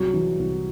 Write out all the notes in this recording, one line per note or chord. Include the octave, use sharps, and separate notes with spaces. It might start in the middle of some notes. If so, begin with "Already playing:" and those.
Already playing: C2 F#3 G3
E3
C2